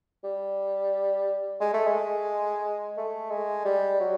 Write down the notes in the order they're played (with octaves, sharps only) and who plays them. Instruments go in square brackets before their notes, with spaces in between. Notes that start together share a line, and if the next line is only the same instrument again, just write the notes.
[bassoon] G3
G#3
A3
G#3
A3
G#3
G3
F#3